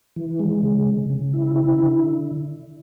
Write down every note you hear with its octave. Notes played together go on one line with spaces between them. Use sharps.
E3
G#3
C#3
C#3
C#3
E4
E4
D3